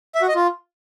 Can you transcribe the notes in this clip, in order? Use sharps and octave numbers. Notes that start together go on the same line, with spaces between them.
E5
F#4
D#5
F4